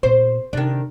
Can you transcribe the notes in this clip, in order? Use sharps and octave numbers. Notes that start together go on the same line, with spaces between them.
A#2 B3 C5
C3 D#3 D4